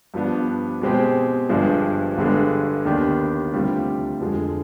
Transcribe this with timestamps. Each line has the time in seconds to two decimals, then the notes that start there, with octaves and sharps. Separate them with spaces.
0.14 G2 F3 B3 D4
0.82 B2 G#3 C4 G4
1.49 G1 G2 F3 G#3 D4
2.17 G1 G2 D3 G#3 D4
2.85 D#2 D#3 B3 D4 G4
3.53 D2 C3 G3 D4 F4
4.20 F2 D3 F3 G#3